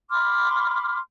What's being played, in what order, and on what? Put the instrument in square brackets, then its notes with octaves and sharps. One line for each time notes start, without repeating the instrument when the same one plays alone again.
[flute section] B5 C6 D6 F6